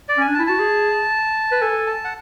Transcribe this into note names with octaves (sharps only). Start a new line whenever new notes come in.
D5
C#4 G#5
D4
A5
E4
F#4 A5
G#4
B4
A4 G#5
A5
F#5